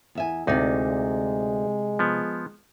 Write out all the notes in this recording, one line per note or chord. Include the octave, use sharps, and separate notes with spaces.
E2 E5 G#5
D2 C3 G#3 D#4 E4 D5
F3 B3